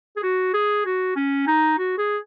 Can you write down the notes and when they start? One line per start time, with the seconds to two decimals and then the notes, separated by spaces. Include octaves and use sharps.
0.17 G#4
0.23 F#4
0.54 G#4
0.85 F#4
1.16 C#4
1.47 D#4
1.78 F#4
1.98 G#4